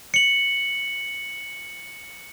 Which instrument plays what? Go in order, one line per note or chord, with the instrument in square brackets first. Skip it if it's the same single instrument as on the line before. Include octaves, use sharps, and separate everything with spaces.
[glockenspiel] C#7 F#7